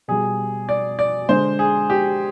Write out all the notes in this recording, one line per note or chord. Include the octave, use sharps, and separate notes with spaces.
B2 G3 G#4
D5
D5
D3 G#3 C5
G#4
G4